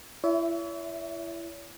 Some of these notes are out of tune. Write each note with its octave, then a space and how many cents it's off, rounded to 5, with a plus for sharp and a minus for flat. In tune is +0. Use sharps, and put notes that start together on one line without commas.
E4 +30 C#5 +40 E5 +0